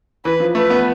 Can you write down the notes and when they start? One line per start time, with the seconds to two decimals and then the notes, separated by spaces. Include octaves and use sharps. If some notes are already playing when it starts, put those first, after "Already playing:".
0.25 E3 B4
0.40 F3
0.55 A3 B4
0.70 B3